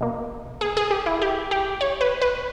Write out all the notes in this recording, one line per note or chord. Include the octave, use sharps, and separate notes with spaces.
B2 A#3
G#4
G#4
G4
E4
G4
G4
C#5
B4
B4